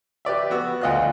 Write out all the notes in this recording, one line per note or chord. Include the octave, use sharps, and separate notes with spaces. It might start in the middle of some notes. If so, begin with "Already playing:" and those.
G4 B4 D5 E5
B3 F#4 E6
D2 F4 D#5 F5 F#6